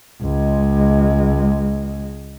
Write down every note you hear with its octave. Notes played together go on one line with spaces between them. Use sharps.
C#2 G#3